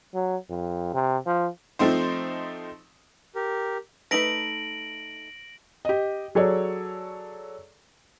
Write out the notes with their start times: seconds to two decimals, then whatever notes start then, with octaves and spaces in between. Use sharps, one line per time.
0.14 F#3
0.50 F2
0.94 C3
1.26 F3
1.79 F3 A3 C4 D#4 C5
3.35 G4 A#4
4.11 A3 D#4 B4 A#6 D7 F#7
5.85 G4 D#5
6.35 F#3 G#4 A4 C#5 D5